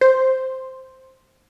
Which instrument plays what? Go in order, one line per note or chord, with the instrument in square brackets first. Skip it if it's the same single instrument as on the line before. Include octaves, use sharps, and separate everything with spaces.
[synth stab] C5